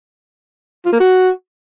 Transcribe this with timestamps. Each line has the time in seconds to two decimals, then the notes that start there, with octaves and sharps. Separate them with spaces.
0.85 F4
0.93 A#3
1.00 F#4